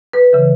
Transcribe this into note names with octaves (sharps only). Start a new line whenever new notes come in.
B4
C#3 E3